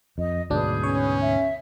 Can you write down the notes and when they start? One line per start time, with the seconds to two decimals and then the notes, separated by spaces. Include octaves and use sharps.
0.18 F2 D#5
0.50 D2 G#2 B2 F#3 D4 G#4 B4 G6
0.83 C#4 C#5
1.22 E5